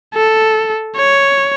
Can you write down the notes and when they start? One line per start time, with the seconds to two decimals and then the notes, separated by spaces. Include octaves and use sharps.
0.15 A4
0.97 C#5